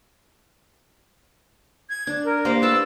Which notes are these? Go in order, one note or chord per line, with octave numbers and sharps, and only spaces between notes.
G#6
D4
A#4
A#3 G4 C5
B4 A5 B5 E6